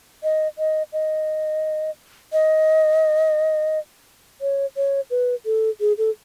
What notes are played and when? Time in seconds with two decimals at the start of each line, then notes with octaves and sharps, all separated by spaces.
0.23 D#5
0.58 D#5
0.93 D#5
2.33 D#5
4.41 C#5
4.76 C#5
5.11 B4
5.46 A4
5.81 G#4
5.98 A4